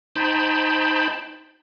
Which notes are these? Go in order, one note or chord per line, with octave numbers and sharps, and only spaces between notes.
D#4 C5 G5 A5 B5